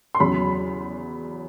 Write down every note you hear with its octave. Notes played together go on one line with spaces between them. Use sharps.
C6
E2 C#3 F#3 B5